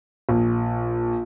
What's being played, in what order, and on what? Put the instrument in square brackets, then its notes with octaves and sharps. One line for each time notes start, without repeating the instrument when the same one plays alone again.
[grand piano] A#1